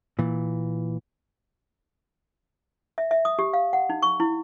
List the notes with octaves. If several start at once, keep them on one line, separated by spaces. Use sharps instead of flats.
A#2 E3
E5
E5
D#6
G4
F5
F#5
D#4
C#6
E4